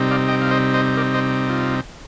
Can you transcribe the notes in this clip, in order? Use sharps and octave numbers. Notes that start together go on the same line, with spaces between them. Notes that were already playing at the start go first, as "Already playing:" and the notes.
Already playing: C3 G3 C4 D#4
D5 F5
D#5 G5
F5
C5 D#5
C5 D#5
A#4 D5
C5 D#5
F4